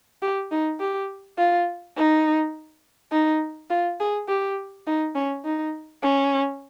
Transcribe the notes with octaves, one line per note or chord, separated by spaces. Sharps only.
G4
D#4
G4
F4
D#4
D#4
F4
G#4
G4
D#4
C#4
D#4
C#4